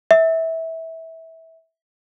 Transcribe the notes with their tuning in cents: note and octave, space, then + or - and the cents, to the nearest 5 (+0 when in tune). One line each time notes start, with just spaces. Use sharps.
E5 -20